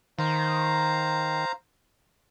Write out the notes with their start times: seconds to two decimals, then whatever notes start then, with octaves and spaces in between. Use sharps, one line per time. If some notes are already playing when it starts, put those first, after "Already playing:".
0.19 D#3 C5 F5 A#5